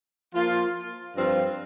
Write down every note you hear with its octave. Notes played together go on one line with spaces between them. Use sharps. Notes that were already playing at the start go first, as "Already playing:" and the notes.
F3 A#3 F4
G2 F3 C4 F4